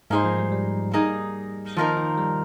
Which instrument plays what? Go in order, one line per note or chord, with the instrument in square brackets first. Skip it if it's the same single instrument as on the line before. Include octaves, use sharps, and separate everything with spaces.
[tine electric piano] G#2 [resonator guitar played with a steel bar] A#3 D#4 G#4 C5
[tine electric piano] F3
G3
G3
[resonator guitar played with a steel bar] A#3 D#4 G#4
[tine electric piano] D#3 [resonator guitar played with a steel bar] F3 A#3 D#4 A#4
[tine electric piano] D#3
G3